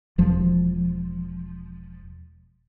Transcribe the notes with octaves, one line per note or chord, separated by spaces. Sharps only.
E1 F3